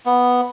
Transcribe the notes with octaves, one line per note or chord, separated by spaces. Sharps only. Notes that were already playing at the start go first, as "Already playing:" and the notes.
B3